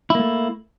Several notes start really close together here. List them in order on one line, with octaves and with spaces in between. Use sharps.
E4 A#3 A3